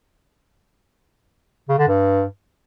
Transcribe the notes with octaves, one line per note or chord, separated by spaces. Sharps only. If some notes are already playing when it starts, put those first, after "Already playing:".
C#3
D3
G2